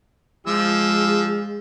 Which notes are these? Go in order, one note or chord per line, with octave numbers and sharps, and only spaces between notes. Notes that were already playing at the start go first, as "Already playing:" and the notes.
F3 G#3 E6